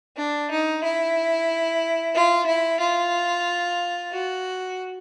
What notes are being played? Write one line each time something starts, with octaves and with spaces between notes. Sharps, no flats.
D4
D#4
E4
F4
E4
F4
F#4